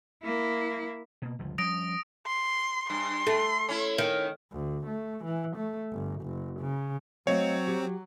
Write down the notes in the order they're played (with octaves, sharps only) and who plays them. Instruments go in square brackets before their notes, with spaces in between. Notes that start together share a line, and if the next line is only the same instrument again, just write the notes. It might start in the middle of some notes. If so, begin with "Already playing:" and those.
[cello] A#3 E4
[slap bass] B2 A#3
G1 C#2 F3
[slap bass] F3 G3 C#4 [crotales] D#6 A#6 D7
[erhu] C6
[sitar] G2 [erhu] C6
[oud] A3
[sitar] C#4 E4
[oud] D#3
[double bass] D2
A3
E3
A3
G1
F#1
C#3
[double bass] F#3 [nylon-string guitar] A3 D#5 F5 [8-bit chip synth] C4 [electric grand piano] C#5
[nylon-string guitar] G4